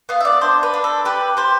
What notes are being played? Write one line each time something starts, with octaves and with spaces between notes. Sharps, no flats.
B3 F5
E5
D5
D4 C5
B4
D4
A4
G4 B4
G4 C5